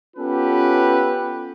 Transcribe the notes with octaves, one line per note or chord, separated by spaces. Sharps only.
B3 C#4 F4 G4 A4 B4